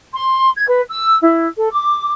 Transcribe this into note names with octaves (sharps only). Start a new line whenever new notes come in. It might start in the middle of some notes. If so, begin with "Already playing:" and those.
C6
G#6
B4
E6
E4
A4
D6